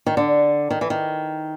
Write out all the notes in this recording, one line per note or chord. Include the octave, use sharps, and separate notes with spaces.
D#3
D3
D#3
E3
D#3